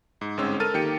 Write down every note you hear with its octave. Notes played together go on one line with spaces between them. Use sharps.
G#2
G1 G#2 G#3 C4 C#4 E6
A4 A#4 F6 A6 D#7
D#3 A#3 G4 G5 C#7